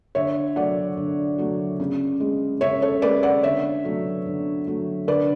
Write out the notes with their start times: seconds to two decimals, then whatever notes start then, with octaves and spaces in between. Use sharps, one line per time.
0.15 D3 C#5 E5
0.56 F#3 A3 D5 F#5
0.97 D3
1.38 F#3 A3
1.80 C#3
2.20 G#3
2.61 C#3 C#5 E5
2.82 A4 C#5
3.02 G#3 B4 D5
3.23 D5 F#5
3.43 D3 C#5 E5
3.84 F#3 A3
4.26 D3
4.67 F#3 A3
5.08 D3 B4 D5